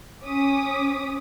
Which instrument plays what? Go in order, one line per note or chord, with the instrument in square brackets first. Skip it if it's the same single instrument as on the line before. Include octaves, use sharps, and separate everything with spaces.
[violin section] C#4 D6 D#6 B6